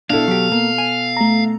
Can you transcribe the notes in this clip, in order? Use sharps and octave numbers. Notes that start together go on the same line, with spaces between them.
B2 D4 E4 A4 F5
F#3 G4
A#3
G#5
A3 A#5